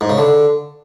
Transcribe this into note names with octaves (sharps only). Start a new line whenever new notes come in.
G#2
C#3
D3